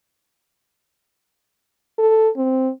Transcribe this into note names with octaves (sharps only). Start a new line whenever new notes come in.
A4
C4